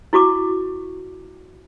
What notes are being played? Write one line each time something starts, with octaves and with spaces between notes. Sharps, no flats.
E4 F#4 C#6 D6